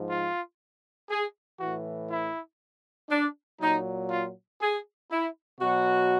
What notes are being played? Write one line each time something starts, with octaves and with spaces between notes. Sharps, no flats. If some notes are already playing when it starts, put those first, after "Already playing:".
Already playing: G#2 F3
F4
G#4
A2 E3 F#4
E4
D4
A#2 F#3 D#4
F4
G#4
E4
B2 F#3 F#4